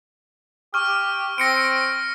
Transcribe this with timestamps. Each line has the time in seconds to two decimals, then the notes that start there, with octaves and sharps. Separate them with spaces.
0.74 G4 C#6 F6
1.38 C4 A#6 C#7 D7